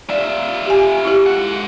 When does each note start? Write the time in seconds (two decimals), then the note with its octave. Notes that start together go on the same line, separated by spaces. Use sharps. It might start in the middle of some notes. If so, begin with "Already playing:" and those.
0.10 F4 D5 E5
0.67 G4 G#5
1.05 E4 G4
1.26 G#3 F#5